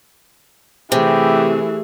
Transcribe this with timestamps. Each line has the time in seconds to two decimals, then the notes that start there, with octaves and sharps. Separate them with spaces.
0.92 C3 E3 A3 G4 G#4